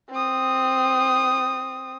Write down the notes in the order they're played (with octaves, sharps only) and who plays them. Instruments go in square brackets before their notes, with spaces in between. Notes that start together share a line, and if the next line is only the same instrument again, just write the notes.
[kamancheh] C4 D#6